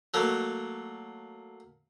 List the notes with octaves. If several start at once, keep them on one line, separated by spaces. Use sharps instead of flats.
F#3 A3 A#3